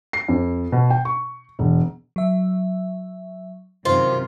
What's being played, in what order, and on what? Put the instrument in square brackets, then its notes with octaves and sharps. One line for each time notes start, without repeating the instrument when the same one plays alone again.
[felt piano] C7
F2
B2
G5
C#6
E1
[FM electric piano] F#3 E5
[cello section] F#2 C3 D#3 [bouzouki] F4 [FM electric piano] C5